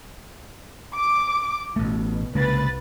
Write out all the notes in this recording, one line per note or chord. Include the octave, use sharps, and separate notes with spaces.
D6
A1 B2 A3
C2 C#3 G#3 A#3 B4 A6